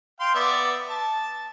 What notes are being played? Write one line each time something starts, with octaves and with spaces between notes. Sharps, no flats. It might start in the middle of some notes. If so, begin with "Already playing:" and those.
F5 G5 C6
B3 D5 E5
A5